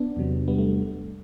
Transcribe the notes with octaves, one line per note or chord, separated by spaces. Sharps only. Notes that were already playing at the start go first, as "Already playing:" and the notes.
Already playing: B3 D4
E2 C3 F#3
G3 B3
A3
A3